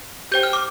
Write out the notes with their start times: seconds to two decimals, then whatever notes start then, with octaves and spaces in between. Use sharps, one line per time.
0.32 G4 C5 G5 G6
0.43 F6
0.53 D6